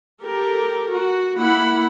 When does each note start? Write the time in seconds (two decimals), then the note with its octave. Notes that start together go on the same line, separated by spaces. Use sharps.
0.23 G4 A4 A#4
0.92 F#4
1.39 A#3 E4 F#5 B5